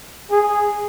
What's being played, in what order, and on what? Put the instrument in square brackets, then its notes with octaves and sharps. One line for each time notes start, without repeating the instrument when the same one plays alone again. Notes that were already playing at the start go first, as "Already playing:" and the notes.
[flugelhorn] G#4